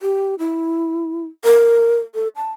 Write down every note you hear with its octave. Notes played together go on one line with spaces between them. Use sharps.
G4
E4
A#4
A4
A5